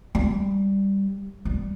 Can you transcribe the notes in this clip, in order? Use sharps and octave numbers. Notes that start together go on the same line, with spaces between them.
G3
G3